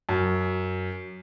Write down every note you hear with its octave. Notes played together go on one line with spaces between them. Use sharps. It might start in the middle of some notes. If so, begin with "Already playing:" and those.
F#2